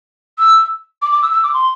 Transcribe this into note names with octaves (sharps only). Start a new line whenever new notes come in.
E6
D6
D6
E6
E6
D6
C6